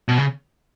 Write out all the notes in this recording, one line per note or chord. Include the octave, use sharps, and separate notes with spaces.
B2
C#3